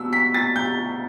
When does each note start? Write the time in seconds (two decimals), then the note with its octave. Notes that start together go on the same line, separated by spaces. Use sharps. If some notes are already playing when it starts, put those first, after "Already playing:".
Already playing: B2 E6
0.13 B6
0.34 A6
0.56 G6